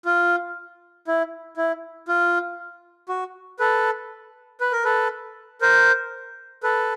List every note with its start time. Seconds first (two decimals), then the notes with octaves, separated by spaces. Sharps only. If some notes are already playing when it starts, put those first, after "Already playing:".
0.05 F4
1.07 E4
1.57 E4
2.08 F4
3.09 F#4
3.59 A4 B4
4.61 B4
4.72 A#4
4.85 A4 B4
5.61 A#4 C5
6.63 A4 B4